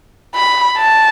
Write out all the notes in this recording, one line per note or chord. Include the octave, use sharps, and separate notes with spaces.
B5
A5